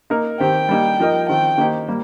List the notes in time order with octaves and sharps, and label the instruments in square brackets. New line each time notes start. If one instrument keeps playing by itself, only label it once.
[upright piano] A#3 D#4 A#4
[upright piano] D#3 C4 G4 C5 [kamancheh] G5
[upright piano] G3 A#3 D#4
F3 D#4 A#4 D#5
[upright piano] D#3 C4 F4 [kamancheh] G5
[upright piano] D#3 A#3 D#4 G4 C5
G3 A#3